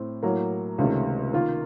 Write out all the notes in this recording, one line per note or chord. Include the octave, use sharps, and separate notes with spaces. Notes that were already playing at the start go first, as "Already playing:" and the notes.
Already playing: A2 C4
A2 F#3 A#3
C#2 C3 D#3 A3 C#4
D#3 A#3 F4